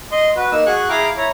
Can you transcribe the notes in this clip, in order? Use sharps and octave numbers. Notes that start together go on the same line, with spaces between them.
D#5 C6
F#4 B4
A#3 D#4 E6
F#4 G#4 C#6 F#6
E4 G#4 F5 G5 A#5 D6
E4 C#5 A#5